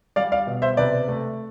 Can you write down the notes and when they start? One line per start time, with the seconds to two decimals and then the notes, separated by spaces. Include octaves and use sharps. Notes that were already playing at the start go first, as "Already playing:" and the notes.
0.16 G3 D5 F5
0.32 D5 F5
0.47 B2
0.62 C5 E5
0.77 C3 B4 D5
1.08 A3